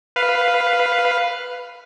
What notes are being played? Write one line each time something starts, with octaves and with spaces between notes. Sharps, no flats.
B4 F5